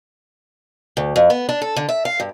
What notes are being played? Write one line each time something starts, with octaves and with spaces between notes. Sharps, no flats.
D2
F2
B3
D4
A4
D3
E5
F5
G2